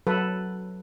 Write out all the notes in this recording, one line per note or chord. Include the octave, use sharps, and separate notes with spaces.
F#3 A4 B4